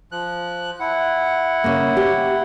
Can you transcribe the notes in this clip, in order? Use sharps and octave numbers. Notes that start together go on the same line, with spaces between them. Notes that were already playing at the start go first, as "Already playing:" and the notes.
F3 F#6
E4 F#5
C#3 A#3
G4